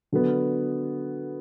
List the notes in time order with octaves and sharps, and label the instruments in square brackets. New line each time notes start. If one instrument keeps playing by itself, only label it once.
[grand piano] D3 F#3 B3